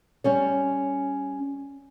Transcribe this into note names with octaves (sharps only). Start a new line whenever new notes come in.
G3 C#4 C#5